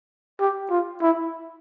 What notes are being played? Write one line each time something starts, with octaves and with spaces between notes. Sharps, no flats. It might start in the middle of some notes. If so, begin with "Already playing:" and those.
G4
F4
E4